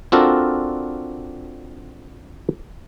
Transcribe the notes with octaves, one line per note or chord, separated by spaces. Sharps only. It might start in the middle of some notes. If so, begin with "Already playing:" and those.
C4 D4 F4 F#4 A4 A#4